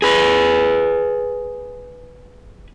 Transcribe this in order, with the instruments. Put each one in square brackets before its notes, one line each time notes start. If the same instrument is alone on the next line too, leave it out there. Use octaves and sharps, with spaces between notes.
[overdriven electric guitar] G#4 B4